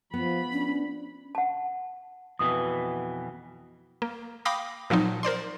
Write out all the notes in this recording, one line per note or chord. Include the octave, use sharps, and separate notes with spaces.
F3 B3 B5
C#4 D4
F#5 A5
F2 B2 E3 D#6
A#3
F5 G5 B5 D6 D#6 A#6
A#2 F3 F#3 C4 D#4
A#4 C5 D5 C6